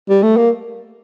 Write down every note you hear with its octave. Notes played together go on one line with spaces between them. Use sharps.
G3
A3
A#3